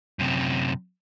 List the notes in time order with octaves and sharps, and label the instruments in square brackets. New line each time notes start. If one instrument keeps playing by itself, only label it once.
[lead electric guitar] F#2 C3